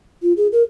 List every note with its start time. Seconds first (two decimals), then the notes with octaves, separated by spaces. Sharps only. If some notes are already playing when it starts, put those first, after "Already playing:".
0.22 F4
0.37 G#4
0.52 A#4